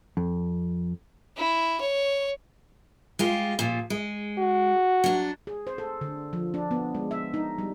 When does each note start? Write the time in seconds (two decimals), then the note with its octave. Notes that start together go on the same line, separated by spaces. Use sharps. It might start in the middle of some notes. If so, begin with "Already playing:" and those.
0.17 F2
1.37 E4
1.81 C#5
3.19 G#3 F4 G4
3.59 A#2 F3
3.90 G#3
4.38 F#4
5.04 F#3 D4
5.47 G#4
5.67 C5
5.78 A4
6.01 D3
6.33 F3
6.54 D4
6.71 B3
6.95 G#3
7.11 E5
7.34 D#4
7.58 G3